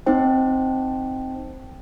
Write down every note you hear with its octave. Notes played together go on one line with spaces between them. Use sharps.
C4 D#4 C5 G5